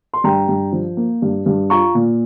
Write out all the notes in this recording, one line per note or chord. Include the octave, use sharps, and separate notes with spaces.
C6
G2 G5 A#5
G2
F3
A#3
G2
G2
F4 A#5 C#6
A#2